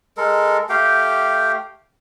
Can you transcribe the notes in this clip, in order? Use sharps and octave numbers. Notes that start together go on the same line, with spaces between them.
G#3 A4 A#4
A3 G4 F5 G5